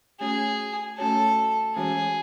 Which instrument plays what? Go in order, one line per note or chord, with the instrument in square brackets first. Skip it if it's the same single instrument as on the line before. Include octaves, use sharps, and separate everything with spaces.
[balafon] A3 C#4 F#4 C#5 [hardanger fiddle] G#4
[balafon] A3 C#4 F#4 C#5 [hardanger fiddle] A4
[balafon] E3 G#3 C#4 F#4 C#5 [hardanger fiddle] G#4